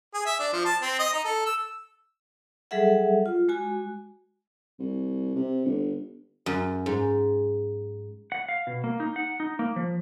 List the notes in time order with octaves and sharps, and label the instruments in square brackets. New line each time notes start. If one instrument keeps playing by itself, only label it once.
[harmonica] G#4
E5
D4
F3
A5
C4
D#5
D#4
A4
E6
[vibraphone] F#3 G3 G#4 A4 E5 F#5
F4
G#3 F#4 G#5
[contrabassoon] C2
C3
G1
[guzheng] F#2
G#2
[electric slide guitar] F#5
F5
B2
A#3
D#4
F#5
D#4
A#3
F3